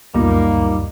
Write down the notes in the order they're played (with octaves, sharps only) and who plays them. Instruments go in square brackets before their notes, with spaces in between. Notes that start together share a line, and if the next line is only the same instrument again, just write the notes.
[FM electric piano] C#2 F#2 [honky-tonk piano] A#2 [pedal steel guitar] G3 D#4 [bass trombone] A#3